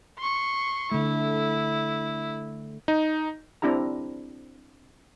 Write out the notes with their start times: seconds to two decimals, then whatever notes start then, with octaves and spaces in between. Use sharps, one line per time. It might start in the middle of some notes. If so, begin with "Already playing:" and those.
0.18 C6 C#6
0.92 D3 A3 E4
2.88 D#4
3.62 C4 D4 E4 G4 A#5